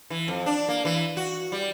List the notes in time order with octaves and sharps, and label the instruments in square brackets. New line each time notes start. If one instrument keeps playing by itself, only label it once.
[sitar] E3
F2
D4
A#3
E3
F#4
G3